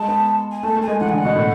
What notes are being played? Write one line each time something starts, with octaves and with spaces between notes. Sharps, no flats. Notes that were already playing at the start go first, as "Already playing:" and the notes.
Already playing: G#3 A5
B3
G#5
A3 A5
A3
G#5
G#3
E3 F#5
D3 G#5
F#5
B2
A2